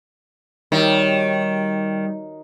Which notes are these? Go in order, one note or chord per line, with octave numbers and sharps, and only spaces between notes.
D#3 G3 F#4 G4 C#5